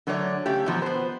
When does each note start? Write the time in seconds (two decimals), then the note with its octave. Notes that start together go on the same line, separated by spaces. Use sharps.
0.07 D3 F#3 A3 C#5 D5
0.46 C#3 A3 G4
0.66 B2 F3 F#3
0.82 B3 C5